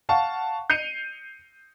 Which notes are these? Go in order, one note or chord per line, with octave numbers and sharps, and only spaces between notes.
F5 F#5 A5 C#6
G6 C7 C#7 D#7 F7